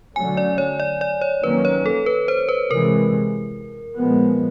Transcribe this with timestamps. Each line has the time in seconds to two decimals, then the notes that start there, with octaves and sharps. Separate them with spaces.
0.16 D3 F#3 A3 C#4 G#5
0.37 D5
0.58 C#5
0.80 D5
1.01 D5
1.22 C#5
1.43 D#3 F#3 A#3 C#4 B4
1.65 C#5
1.86 A4
2.06 B4
2.28 C5
2.49 B4
2.70 C3 E3 G#3 A#4
3.97 A#2 F3 G#3 B3